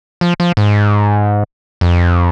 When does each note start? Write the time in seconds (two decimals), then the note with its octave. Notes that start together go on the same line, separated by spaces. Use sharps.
0.21 F3
0.40 F3
0.57 G#2
1.81 F2